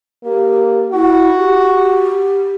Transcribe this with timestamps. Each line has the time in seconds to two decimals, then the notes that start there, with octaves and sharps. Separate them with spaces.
0.24 A#3 G4
0.93 E4 F#4
1.38 G4